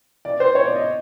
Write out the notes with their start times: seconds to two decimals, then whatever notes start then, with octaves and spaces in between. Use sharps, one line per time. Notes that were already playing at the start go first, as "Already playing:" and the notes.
0.25 D5
0.40 C5
0.55 C#5
0.65 D5
0.76 D#5